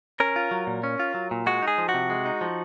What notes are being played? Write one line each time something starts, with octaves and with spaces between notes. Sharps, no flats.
C#4 A#4
F4
F#3
A#2
C#4
F4
F#3
A#2
G#3 F#4
D#4
G#4
F3
F#4
C3
G#3
D#4
F3